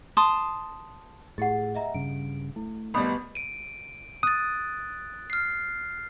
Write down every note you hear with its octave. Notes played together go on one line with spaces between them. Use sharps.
A5 C6 D#6
A2 G4 G#4 F#5 A6
D#5 E5 A#5
G2 C#3 D7
A3 E4
G#1 B2 G3 B4 D#5 B5 D#6
D7 D#7
D#6 F#6 A6
F6 C7